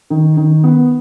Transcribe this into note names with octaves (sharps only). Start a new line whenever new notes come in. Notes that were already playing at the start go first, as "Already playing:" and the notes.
D#3
D#3
B3